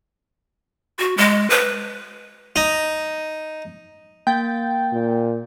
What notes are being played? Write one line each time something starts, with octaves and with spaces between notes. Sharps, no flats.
F#4
G#3
B4
D#4
A#3 G5 A6
A#2